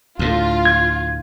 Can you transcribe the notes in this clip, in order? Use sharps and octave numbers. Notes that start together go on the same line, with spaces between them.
D2 A2 F4
G#6